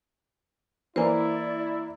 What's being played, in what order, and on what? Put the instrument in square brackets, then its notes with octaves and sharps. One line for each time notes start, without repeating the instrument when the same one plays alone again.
[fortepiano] E3 A#3 [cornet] E4 [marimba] C5 G#5 [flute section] D5